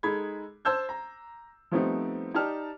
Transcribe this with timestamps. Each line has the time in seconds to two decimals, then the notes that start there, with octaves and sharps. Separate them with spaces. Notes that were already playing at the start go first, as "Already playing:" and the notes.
0.03 G#3 D#4 A4 B5 G#6
0.65 C5 A5 E6 G6 G#6
0.89 A#5
1.72 F3 G3 A3 B3 C4 D#4
2.34 D#4 G4 D5 A5 F6